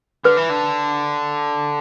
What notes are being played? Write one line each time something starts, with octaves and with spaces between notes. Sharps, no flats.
D3 B4
E3
D3